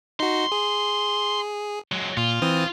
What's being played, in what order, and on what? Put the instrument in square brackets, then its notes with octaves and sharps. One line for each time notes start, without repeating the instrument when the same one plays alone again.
[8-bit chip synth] D#4 F#4 [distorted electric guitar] C6
[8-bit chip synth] G#4
[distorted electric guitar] F#3 G#3
[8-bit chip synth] A#2 [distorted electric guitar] F4
[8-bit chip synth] E3 C4 D#6